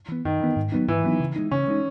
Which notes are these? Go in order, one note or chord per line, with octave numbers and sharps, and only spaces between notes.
E3 B3
F#2 D#3
E3 B3
G#2
F#3 B3 D#4
G#2 E3
F#3 B3 D#4
C#3
G#3 D#4
C#3 C#4
G#3 D#4